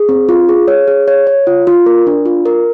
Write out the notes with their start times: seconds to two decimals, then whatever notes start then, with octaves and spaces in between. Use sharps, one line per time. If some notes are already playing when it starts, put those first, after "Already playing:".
Already playing: G#4
0.09 C4
0.29 F4
0.49 G#4
0.68 C#5
0.88 G#4
1.08 C#5
1.27 C#5
1.47 F4
1.67 F4
1.86 A#4
2.07 D4
2.26 F4
2.46 A#4